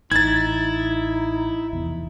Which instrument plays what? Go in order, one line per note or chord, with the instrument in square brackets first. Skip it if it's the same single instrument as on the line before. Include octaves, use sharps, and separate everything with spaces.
[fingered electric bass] A1 [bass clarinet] D#4 [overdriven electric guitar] E4 [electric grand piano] G#6 A6
[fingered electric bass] F1 E2